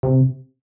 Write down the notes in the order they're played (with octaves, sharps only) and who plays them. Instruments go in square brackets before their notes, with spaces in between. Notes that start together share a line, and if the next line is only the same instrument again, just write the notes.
[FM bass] C3